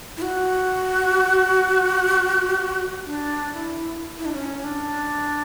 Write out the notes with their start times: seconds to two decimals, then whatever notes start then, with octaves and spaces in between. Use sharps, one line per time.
0.17 E4
0.22 F#4
3.06 D4
3.54 E4
4.19 E4
4.26 D4
4.33 C#4
4.64 D4